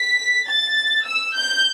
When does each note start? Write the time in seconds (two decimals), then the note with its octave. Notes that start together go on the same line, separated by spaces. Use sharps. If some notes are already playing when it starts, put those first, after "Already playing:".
Already playing: B6
0.47 A6
1.06 E6
1.35 G6